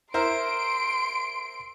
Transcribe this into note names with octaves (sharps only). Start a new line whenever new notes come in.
E4 A#4 C5 C6 D7